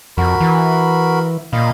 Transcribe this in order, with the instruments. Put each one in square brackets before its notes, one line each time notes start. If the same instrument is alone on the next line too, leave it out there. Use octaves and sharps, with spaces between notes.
[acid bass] F2 [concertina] F#4 A#4 B5
[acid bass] E3
[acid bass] A#2 [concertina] D#5 F5 B5